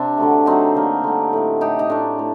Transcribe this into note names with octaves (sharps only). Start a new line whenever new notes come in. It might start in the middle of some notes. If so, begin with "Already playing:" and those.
Already playing: C3 C4 D4
D3 F#3 A3
D3 F#3 A3 C4 D#4
D3 G3 A#3
D3 G3 A#3
A2 A3
A2 A3 D#4 G4
D#4
A2 A3 D4
A2